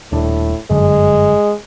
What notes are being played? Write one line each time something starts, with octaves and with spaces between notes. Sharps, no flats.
D#1 A2 D4
G1 F#2 D3 G#3